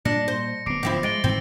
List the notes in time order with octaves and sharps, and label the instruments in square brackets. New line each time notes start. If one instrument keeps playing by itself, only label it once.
[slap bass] A#2 [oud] D4 [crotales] A#6 C#7
[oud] C5
[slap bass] D1 B3 [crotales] D6 C7 D7
[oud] F3 C4 E4
[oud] G#3 [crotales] A6 D7 G7
[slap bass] G#2 D#3 E3 [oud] C4